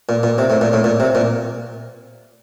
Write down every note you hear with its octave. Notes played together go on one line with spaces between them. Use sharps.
A#2
A#2
C3
A2
A#2
A2
A#2
C3
A#2